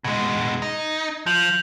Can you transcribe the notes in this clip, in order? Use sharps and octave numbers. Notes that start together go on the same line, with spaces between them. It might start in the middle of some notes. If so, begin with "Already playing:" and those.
B2 G#3 G#6
D#4
F3 G6 F7 F#7